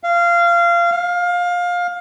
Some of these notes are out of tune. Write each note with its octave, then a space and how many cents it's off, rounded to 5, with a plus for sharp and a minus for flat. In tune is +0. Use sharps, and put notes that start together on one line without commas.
F5 -20
F5 +20